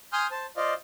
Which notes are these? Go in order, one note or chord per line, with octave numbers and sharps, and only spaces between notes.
G#5 C6 D#6 F6 G6
C5 A5
F4 C5 D5 D#5 F5